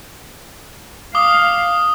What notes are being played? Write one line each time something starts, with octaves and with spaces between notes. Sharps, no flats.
F5 D6 D#6 G7